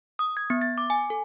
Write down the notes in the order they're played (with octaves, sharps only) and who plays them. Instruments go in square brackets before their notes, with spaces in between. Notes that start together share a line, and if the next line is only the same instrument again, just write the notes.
[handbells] D#6
G#6
B3
A6
D6
G#5
A4